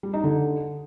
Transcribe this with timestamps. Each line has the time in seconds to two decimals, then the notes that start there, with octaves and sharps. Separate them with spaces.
0.03 G3
0.13 D#4
0.24 D3